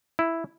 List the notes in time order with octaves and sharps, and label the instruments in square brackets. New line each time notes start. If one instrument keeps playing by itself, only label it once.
[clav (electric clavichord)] E4